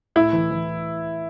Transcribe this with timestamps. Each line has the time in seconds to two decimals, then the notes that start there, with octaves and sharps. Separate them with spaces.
0.16 A2 E4
0.33 E3
0.51 E3